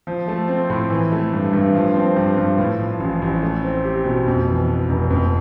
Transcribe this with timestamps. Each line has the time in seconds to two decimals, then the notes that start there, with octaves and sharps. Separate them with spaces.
0.07 F3
0.28 A3
0.48 C4
0.70 A2
0.90 E3
1.12 A3
1.33 G2
1.53 G2
1.75 F3
1.95 C4
2.16 G2
2.37 G2
2.58 A2
2.79 F3
3.00 A1
3.22 A1
3.43 A3
3.63 C4
3.84 G4
4.05 B2
4.26 F2
4.47 E3
4.68 B3
4.89 F1
5.10 F2